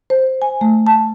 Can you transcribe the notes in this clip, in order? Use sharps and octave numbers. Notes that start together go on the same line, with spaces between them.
C5
G#5
A3
A5